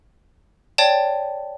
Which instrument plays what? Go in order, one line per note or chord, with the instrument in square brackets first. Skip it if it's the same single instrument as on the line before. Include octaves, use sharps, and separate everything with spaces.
[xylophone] C#5 D5 G5 A5